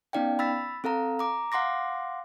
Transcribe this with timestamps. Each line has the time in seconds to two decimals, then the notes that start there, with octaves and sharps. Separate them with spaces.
0.13 B3 C#4 D#4 D5 F5 G5
0.39 B5 E6 A6 B6
0.84 C4 A4 F5 A#5
1.19 A#5 D6
1.52 F5 F#5 C6 D6 A#6